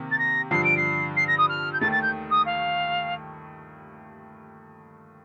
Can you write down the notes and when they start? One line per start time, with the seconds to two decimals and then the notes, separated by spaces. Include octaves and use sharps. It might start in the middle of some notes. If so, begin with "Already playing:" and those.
Already playing: C3 D#3 A#3
0.11 A6
0.19 A#6
0.51 G2 D3 F3 C7
0.64 D7
0.77 C7
1.17 C7
1.28 A#6
1.38 D#6
1.49 F6
1.73 G6
1.81 D#2 D#3 A3 A6
1.92 A6
2.02 G6
2.30 D#6
2.46 F5